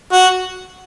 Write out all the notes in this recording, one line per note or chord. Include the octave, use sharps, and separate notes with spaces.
F#4